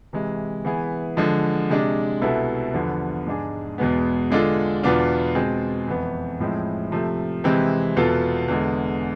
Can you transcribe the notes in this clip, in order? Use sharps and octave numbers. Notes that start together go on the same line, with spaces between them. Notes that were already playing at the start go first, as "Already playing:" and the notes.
C3 E3 G#3
E3 B3 E4 G#4
D3 F3 G#3
C3 G#3 D4
C2 B2 B3 E4 A4
E2 D3 F3 B3
G#2 G#3 D4 G#4
E2 B2 G#3 B3
D3 G#3 D4 F4 A4
E2 B2 B3 D4 F4
B2 G#3 C4 G#4
F2 E3 B3
A2 F3 G#3 C4 E4
C3 F3 A3
C3 E3 G#3 C4
E2 B2 B3 F4 A4
E2 D3 G#3